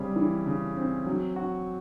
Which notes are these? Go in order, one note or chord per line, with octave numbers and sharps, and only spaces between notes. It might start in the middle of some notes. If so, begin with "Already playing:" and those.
Already playing: C#3 G3 C4
E3
C#3
C4
F#3
F#4